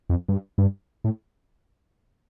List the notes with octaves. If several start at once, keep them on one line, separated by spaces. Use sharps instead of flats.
F2
G2
G2
A2